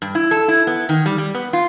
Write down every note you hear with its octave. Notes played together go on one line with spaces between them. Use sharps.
G2
E4
A4
E4
B3
D#3
G3
G3
B3
F4